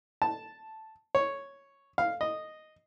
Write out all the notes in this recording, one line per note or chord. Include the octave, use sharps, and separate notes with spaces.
A5
C#5
F5
D#5